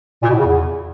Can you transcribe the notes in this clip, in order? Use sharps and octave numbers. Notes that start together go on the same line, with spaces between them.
A#2
B2
A2
C#3
E2